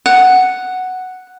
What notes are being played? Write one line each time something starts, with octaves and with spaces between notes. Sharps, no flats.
F#5